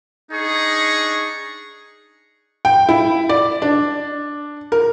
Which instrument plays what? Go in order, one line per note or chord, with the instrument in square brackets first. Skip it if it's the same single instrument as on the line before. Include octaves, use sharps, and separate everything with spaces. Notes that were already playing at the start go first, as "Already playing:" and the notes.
[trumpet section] D4 D#4 G#4 C#6
[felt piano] G5
E4
D5
D4
A#4